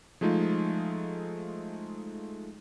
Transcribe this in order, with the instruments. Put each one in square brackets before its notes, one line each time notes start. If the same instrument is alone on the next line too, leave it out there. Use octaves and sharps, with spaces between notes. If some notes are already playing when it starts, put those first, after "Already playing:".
[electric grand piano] F3 G#3 A3 D#4 F4